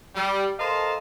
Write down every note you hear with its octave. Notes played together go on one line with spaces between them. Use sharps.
G3
A4 A#4 C5 D#5 F5 A5